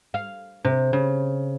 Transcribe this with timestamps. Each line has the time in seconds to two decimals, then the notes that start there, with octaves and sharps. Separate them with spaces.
0.14 F5
0.65 C3
0.93 C#3